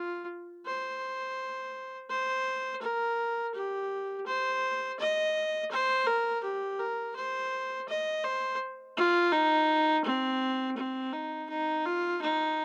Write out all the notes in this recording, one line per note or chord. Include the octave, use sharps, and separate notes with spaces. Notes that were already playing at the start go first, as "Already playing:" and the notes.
Already playing: F4
C5
C5
A#4
G4
C5
D#5
C5
A#4
G4
A#4
C5
D#5
C5
F4
D#4
C4
C4
D#4
D#4
F4
D#4